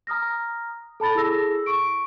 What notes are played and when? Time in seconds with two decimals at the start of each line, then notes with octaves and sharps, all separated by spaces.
0.07 A#5 D#6 F6 A#6
1.00 A4 A5 B5 A6
1.15 E4 G#4 A4 E6 A#6
1.66 C#6 D7